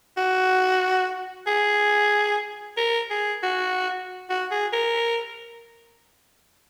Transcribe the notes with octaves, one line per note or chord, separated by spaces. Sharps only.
F#4
G#4
A#4
G#4
F#4
F#4
G#4
A#4